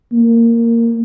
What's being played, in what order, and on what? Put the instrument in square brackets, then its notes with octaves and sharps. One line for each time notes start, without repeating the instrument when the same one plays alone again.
[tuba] A#3